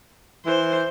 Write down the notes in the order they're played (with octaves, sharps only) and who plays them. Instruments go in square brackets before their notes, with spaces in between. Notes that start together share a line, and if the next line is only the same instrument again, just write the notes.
[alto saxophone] E3 [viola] C5